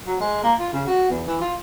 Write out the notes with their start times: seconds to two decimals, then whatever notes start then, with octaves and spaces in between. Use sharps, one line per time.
0.06 F#3
0.20 G#3
0.44 A#3
0.59 F4
0.72 C#3
0.87 F#4
1.10 E2
1.27 E3
1.41 F4